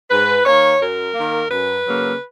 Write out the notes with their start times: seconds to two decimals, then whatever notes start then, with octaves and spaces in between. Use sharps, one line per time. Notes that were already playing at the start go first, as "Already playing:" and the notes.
0.10 G#2 B4
0.46 D#3 A#3 C#5
0.80 F#2 A#4
1.15 D#3 A#3
1.50 F#2 B4
1.85 C#3 F#3 A#3